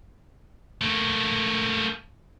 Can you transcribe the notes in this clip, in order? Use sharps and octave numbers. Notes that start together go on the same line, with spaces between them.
A3 A#3